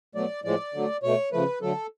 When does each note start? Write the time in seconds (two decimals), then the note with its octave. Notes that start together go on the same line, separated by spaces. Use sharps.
0.15 B2 F#3 A3 D5
0.44 A2 F3 G#3 D5
0.74 D3 F#3 A3
1.03 B2 A3 C#5
1.32 C#3 F3 A3 B4
1.61 D3 F#3 A3 A4